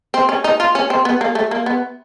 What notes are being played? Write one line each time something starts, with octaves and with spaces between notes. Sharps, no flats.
C4
C#4
D#4
F4
C#4
C4
B3
A#3
A3
A#3
B3